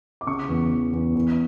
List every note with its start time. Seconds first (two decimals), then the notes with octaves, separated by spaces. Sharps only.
0.21 D6
0.27 C#3 C#6
0.49 E2
0.71 E2
0.93 E2
1.15 E2